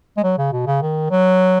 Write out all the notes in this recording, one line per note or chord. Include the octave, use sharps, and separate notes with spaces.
G#3
F#3
C#3
B2
C#3
D#3
F#3